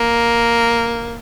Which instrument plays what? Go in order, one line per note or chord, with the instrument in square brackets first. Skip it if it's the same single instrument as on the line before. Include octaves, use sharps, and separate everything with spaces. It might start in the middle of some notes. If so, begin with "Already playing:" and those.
Already playing: [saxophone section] A#3